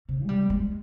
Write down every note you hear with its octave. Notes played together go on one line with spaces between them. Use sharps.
C3
G#3
G3
G#3